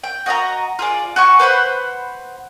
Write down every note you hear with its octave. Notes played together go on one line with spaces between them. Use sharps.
G5
F#4 D#5 E5 A#5
F4 G#4 D5
F#4 G#5 C#6
B4 C5 F#5 B5